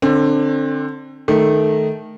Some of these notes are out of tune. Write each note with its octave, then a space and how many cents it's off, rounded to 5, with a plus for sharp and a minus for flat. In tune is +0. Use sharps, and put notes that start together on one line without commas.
D3 +20 C4 +30
D#3 -5 A3 -15